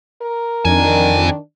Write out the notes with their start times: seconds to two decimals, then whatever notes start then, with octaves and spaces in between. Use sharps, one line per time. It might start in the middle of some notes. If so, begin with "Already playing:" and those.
0.22 A#4
0.65 F2 D#3 E3 D4 G#5